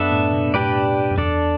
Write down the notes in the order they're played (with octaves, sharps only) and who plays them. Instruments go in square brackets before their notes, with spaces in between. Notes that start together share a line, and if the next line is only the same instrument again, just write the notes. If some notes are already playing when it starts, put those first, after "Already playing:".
Already playing: [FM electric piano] F#2 [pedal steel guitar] B3 D4 A4 E5
[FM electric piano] A2
B2
B2
[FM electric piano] A2 [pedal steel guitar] D4 G4 B4 D5
[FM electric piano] F#2
[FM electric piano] E2 [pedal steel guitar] D4 A4 D5